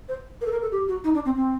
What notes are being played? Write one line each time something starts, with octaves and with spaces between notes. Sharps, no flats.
C5
A#4
A4
A#4
A4
G4
F#4
D#4
D4
C4
C4